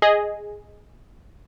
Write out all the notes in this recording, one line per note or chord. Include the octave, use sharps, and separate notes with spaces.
G#4 D#5